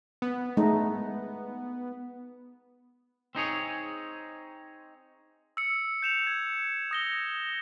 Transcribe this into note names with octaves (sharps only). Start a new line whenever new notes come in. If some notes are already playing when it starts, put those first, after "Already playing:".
B3
G#3 A3 D#4
C4 D#4 G#4 C#5
E6 C#7
G6 E7 F7
G#6
D#6 A#6 G7